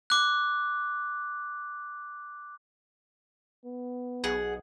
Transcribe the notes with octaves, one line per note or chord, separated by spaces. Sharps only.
D6 F#6
B3
B1 G#4 F#5